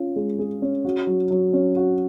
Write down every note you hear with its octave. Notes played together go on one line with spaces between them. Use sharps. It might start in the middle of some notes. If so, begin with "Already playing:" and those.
Already playing: C#4 F4
G#3
G#4
C#4
F#4
F#3
F#3
C#4
F#4